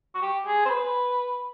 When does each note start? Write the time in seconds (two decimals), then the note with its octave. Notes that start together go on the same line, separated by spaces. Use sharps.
0.15 F#4
0.22 G4
0.46 G#4
0.65 C5
0.69 B4